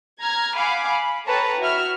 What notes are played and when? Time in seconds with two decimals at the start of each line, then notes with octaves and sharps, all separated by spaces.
0.20 A#5 F6 G#6
0.56 F5 F#5 G#5 B5 D6
0.90 B5
1.27 A4 B4 C#5 G5 A5 A#5
1.59 E4 F#4 E5 F6